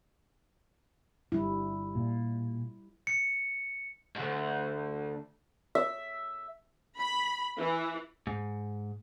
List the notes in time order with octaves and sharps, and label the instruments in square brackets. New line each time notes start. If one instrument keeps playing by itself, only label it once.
[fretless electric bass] G1 [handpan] G3 E4
[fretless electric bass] A#2
[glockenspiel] C#7
[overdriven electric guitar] D2 G#2
[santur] E5
[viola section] B5
E3
[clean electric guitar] G#2